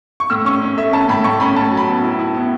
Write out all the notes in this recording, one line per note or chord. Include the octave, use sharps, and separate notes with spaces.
C#6
A2 E6
C#4 C#6
C#4
A3 E5
C#4 A5
A2 B5
A2 C#6
C#4 B5
A2 A5
F#3
B5
B3
E4
E4
B3